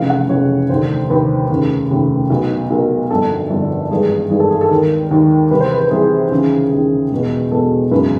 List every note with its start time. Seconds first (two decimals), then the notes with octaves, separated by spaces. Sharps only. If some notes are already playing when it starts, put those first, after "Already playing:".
Already playing: F1 F2 C#3 E3 F5
0.10 F#5
0.29 F1 F2 C#3 E3 C#5
0.69 F1 D#2 D3 C5
1.10 F1 D#2 D3 B4
1.50 F1 D#2 C#3
1.90 F1 D#2 C#3
2.30 B1 B2
2.70 B1 B2 A#4
3.10 G1 F2 D3 A4
3.50 G1 F2 D3
3.90 G#1 G2 E3 G#4
4.30 G#1 G2 E3 G#4
4.40 A4
4.50 G#4
4.61 A4
4.71 D#2 D#3 A#4
5.11 D#2 D#3
5.51 C2 C3 E3 B4
5.61 C5
5.71 B4
5.81 B4
5.90 C2 C3 E3 G#4
6.31 D#2 C#3 E3
6.71 D#2 C#3 E3
7.11 E1 E2 B2
7.51 E1 E2 B2 A4
7.91 G#1 F#2 C#3 E3 B4